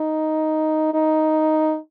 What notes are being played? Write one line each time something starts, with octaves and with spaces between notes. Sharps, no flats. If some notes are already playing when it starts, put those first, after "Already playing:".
Already playing: D#4
D#4